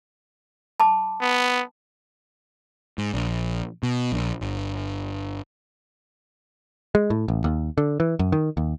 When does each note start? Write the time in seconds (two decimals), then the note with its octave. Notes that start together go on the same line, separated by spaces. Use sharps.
0.80 A5 B5 D6
1.21 B3
2.98 G#2
3.14 A#1
3.83 B2
4.12 A#1
4.41 G1
6.95 G#3
7.10 A2
7.28 A1
7.44 D#2
7.78 D3
8.00 E3
8.19 F#2
8.32 D#3
8.57 D#2